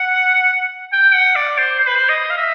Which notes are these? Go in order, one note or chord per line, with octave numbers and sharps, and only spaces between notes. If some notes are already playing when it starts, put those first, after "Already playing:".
Already playing: F#5
G5
F#5
D5
C5
C5
B4
C5
D#5
F5
E5